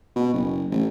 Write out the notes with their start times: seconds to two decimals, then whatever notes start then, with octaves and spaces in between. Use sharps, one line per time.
0.16 B2
0.33 F#1
0.71 A1